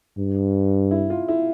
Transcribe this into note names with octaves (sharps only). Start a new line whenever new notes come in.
G2
E4
F4
E4